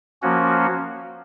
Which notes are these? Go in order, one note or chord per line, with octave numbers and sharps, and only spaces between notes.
F3 A#3 C#4 F#4